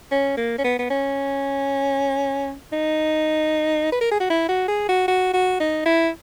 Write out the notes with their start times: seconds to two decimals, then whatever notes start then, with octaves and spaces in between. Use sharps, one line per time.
0.11 C#4
0.37 A#3
0.58 C#4
0.64 B3
0.79 B3
0.90 C#4
2.73 D#4
3.92 B4
4.01 A#4
4.11 G#4
4.20 F#4
4.30 E4
4.48 F#4
4.68 G#4
4.89 F#4
5.08 F#4
5.33 F#4
5.60 D#4
5.86 E4